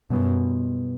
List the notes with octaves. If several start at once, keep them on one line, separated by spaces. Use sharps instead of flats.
F#2 B2 G3 B3